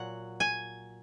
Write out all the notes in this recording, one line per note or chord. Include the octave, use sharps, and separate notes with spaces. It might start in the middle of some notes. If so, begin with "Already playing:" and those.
Already playing: A#2 F#3 F#5
G#5